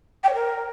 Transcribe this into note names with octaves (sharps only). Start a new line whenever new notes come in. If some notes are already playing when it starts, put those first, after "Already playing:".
G5
C#5
A#4